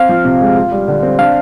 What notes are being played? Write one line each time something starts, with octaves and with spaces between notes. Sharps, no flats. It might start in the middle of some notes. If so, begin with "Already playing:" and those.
Already playing: C4 F5
F3
C3
G#3
F4
G3
D3
C4
D4 F5